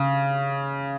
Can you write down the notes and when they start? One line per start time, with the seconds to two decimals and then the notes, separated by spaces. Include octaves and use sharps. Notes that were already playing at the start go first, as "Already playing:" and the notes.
Already playing: C#3